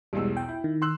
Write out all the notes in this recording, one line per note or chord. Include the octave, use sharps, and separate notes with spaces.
B1 E2 G3 G#3 E6
G5
E4
D#3
C6 E6 F#6